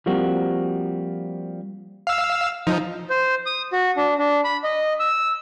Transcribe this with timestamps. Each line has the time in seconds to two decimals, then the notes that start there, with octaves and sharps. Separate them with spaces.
0.06 F3 G3 A#3 C4 F#4
2.07 F5 E6
2.67 F3 D#4
3.10 C5
3.46 D#6
3.73 F#4
3.97 D4
4.18 D4
4.44 B5
4.64 D#5
5.00 E6